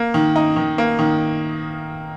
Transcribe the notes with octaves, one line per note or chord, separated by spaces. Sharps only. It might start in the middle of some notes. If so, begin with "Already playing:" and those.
Already playing: A#3
D#3
D#4
D#3
A#3
D#3